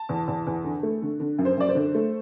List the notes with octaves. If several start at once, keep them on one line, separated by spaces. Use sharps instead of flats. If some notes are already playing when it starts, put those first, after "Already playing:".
Already playing: A5
E2
E2
E2
D3
A3
D3
D3
F#2
C5
F#2 D5
C5
D3
A3